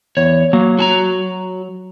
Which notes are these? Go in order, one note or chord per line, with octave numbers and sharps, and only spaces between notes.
E2 C#5
F#3 A#3
F#4 A5 A#5